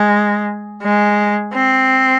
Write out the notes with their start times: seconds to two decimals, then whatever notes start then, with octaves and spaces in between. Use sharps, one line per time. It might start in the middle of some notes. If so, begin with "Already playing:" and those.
Already playing: G#3
0.82 G#3
1.55 C4